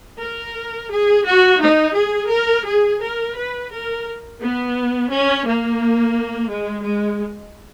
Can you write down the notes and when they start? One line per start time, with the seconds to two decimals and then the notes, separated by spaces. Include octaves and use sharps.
0.18 A#4
0.88 G#4
1.24 F#4
1.59 D#4
1.93 G#4
2.28 A#4
2.64 G#4
2.99 A#4
3.34 B4
3.69 A#4
4.40 B3
5.09 C#4
5.44 A#3
6.50 G#3
6.85 G#3